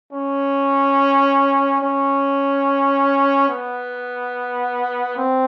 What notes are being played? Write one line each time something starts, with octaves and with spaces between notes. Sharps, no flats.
C#4
C#4
B3
C4